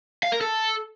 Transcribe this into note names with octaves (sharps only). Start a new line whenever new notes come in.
F5
A#4
A4